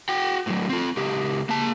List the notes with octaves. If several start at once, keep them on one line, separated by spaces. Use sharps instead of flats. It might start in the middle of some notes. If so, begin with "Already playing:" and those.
F#4 G5
A2 F#3
C4 F4
C#2 G4
A#3 A5